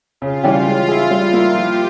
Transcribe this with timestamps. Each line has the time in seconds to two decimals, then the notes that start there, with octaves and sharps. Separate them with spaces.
0.21 C#3 F4
0.43 E3 G3 C#4 G4
0.66 G#3
0.89 E4 G#4
1.11 G3
1.33 A#3 E4 A#4
1.55 F3 G4